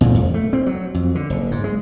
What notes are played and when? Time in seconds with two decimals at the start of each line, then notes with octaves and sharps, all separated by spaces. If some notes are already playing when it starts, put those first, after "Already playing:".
0.01 A#2
0.14 F2
0.34 A3
0.53 C4
0.66 F#3
0.94 F2
1.15 D3
1.30 F#1
1.51 G#2
1.64 G#3